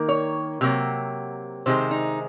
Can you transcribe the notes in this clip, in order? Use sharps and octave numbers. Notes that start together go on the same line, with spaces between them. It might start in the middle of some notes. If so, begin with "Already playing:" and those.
Already playing: D#3 A#3
C#5
C3 F#3 A#3
C3 D#3 G#3 C5
D#4